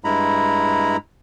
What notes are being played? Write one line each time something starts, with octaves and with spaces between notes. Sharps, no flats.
G2 G#3 E4 A#5 B5